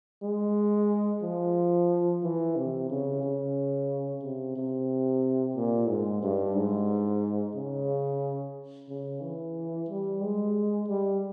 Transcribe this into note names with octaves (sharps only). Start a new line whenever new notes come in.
G#3
F3
E3
C3
C#3
C#3
C3
C3
A#2
G#2
G2
G#2
C#3
C#3
E3
G3
G#3
G3